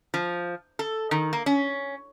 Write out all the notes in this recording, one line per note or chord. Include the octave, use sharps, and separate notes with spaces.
F3
A4
D#3
A#3
C#4